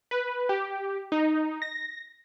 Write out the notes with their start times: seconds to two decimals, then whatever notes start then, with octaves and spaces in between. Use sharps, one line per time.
0.11 B4
0.49 G4
1.12 D#4
1.62 A#6